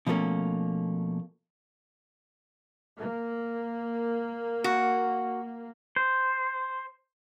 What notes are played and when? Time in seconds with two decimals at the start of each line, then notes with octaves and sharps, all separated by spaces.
0.07 B2 F3 G3 A3 A#3 C#4
2.99 A#3
4.64 F#4
5.96 C5